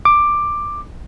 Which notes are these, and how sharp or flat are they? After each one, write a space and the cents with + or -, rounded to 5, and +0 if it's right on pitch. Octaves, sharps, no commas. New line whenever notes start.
D6 +10